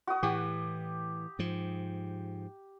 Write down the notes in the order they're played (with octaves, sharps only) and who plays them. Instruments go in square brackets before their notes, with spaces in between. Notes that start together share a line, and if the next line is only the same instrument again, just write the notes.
[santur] F#4 D#6
[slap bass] A2 E3 [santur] G4
[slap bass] G#2 F3